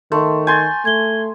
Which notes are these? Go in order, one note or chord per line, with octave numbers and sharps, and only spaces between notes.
D#3 A3 C6
G#5 C6 G6 A6
A3 G#6 G7